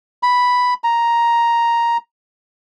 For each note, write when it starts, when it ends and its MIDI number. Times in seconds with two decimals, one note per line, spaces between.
0.23 0.74 83
0.84 1.97 82